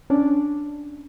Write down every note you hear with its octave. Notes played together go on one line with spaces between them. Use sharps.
C#4 D4